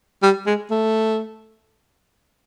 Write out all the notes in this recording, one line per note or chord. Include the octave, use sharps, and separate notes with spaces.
G3
G#3
A3